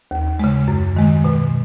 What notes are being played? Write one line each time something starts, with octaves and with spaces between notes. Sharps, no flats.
D#2
C#3 G#3
F#2
D#3 G#3
B2